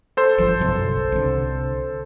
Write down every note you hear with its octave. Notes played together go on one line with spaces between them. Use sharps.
A4 C5
G1 F3
F#1 B1
C2 D3